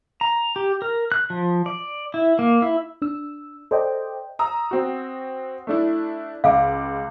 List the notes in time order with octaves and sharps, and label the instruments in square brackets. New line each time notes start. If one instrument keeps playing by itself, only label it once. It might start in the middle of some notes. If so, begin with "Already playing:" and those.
[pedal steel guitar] A#5
G4
A#4
F#6
F3
D5
E4
A#3
E4
[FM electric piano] D4 E6
A4 C5 D5 D#5 G5
[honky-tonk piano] A#5 D#6 E6
C4 F#4
A3 D4 E4
[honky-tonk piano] C#2 D6 [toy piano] F5 F#5